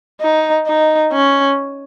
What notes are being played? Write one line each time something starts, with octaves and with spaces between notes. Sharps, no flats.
D#4
D#4
C#4